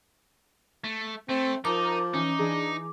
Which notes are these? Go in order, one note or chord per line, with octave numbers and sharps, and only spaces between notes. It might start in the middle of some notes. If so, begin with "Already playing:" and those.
A3
A3 C4
F3 D#4 A#4 A5 A#5 D6
E3 C#4 D#4
E3 D4 G#4 A#5